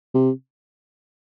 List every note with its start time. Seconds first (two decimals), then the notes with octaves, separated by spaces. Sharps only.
0.14 C3